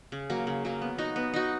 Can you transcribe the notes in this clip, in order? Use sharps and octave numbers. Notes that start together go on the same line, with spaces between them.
C#3
F#3 A#3
C#3
F#3 A#3
B3
D#4 F#4
B3
D#4 F#4